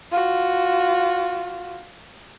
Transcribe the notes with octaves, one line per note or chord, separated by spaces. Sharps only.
F4 F#4